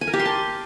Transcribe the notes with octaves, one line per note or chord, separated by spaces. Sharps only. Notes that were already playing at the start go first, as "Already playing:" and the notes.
G#5
A#4
G4
C6
A5